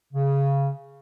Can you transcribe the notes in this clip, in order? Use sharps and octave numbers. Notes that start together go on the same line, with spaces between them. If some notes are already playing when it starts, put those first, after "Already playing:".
C#3